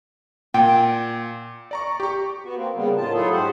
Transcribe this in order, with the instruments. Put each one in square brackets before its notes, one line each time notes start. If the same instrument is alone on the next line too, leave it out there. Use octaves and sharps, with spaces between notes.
[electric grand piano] A#2 [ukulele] G5
[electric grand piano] D5 A#5 C#6
G4 C#6
[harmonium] B3 F#4
A#3 C4
C#3 G3 A#3 B3
A2 D#3 F4 A5
F#3 A3 E4 F4 G#4 A4
G#2 G4 C5 F#5